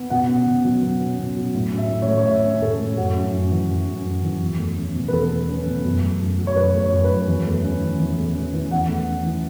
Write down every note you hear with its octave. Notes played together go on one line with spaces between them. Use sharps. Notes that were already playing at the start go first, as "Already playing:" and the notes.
Already playing: B3
B2 F#5
C#4
B2
F#3
B2
C#4
B2
F#3
A2
C#4
E5
A2
C#5
A3
C#5
A2 E5
C#4
A2 A4
A3
F#2 F#4
C#4
F#2
E3
F#2
C#4
F#2
E3
E2
A3
C#4
B2
B4
E2 A4
A3
C#4
B2
F#2
A3
F#2
F#3
C#5
F#2 B4
A3
C#5
F#2
B4
F#3
E2
A3
C#4
E3
E2
A3
C#4
E3
E2 F#5
A3
C#4
E3